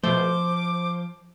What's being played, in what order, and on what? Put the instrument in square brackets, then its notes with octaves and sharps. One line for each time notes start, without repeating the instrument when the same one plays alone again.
[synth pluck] B2 A3 [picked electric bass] F3 [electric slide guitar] C5 [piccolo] D6